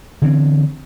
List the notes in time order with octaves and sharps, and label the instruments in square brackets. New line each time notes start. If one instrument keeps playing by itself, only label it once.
[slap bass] D3 E3 C4